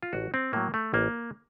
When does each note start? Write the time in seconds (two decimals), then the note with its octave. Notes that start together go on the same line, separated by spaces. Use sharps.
0.03 F4
0.13 A1 F#4
0.34 C4
0.53 A2 F#3 A#3
0.74 A3
0.93 A1 A#3